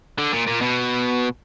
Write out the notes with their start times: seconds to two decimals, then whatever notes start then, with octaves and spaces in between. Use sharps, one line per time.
0.18 D3
0.32 A#2
0.47 A#2
0.62 B2